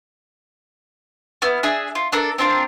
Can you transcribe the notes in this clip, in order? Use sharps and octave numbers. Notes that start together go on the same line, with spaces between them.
B3 E4 F6
D4 G#4 E5
F4
D4 A4 A#4
C4 D4 F4 A#4